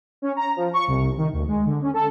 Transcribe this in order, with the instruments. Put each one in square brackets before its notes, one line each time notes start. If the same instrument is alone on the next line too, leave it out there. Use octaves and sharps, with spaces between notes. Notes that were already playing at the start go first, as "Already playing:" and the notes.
[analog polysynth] C#4
A#5
F3
C#6
C2
D#3
D2
G#3
D3
C#4
A4